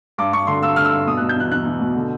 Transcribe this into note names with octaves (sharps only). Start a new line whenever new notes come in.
G2 D6
G2 C#6
D3 C6
G2 E6
D3 F6
E6
G2
B2 D#6
F#6
B2
G6
E2 F#6
E2 F#6
B2
B2
D3